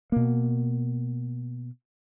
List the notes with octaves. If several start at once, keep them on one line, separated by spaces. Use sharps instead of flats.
B2 A#3